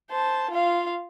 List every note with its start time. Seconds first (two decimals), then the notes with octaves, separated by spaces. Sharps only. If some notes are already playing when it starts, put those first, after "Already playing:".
0.10 C5 A5
0.50 F4 F5